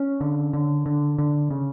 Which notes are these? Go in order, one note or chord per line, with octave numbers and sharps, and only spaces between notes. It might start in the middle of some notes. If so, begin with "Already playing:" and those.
Already playing: C#4
D3
D3
D3
D3
C#3